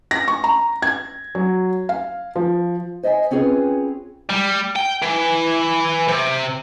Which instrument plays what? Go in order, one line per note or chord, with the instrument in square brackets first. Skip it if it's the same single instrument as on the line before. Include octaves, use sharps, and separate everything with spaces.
[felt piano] A#6
C#6
A#5
G#6
F#3
F5
F3
[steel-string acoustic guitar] C5 D#5 E5 F#5 G#5
C4 C#4 F4 G#4 B4
[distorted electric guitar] G3
G5
E3
C3